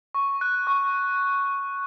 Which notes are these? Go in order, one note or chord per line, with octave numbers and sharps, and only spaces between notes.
C#6
F#6
C#6